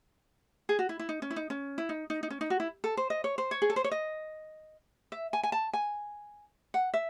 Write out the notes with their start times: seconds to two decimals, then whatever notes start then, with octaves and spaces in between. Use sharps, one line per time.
0.69 G#4
0.79 F#4
0.89 E4
0.99 E4
1.09 D#4
1.22 C#4
1.30 E4
1.36 D#4
1.50 C#4
1.78 E4
1.89 D#4
2.10 D#4
2.23 D#4
2.30 C#4
2.41 D#4
2.50 F#4
2.60 E4
2.84 A4
2.97 C5
3.10 D#5
3.24 C#5
3.38 C5
3.51 C#5
3.62 G#4
3.70 A4
3.76 C5
3.84 C#5
3.91 D#5
5.12 E5
5.33 G#5
5.43 G#5
5.52 A5
5.73 G#5
6.74 F#5
6.94 E5